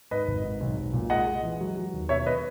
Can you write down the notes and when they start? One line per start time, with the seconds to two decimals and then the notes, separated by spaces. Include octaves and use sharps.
0.11 G#2 B4 D#5
0.28 G#1
0.44 G#2
0.60 B1
0.77 B1
0.93 A#2
1.10 G#3 D#5 F#5
1.27 G#3
1.43 E3
1.61 F#3
1.77 F#3
1.93 D#2
2.09 B2 C#5 E5
2.26 B4 D#5